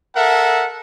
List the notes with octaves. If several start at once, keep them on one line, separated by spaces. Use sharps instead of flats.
A4 A#4 E5 F#5